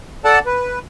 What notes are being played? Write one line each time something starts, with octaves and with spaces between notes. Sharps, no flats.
A4 D5 F#5 A5
B4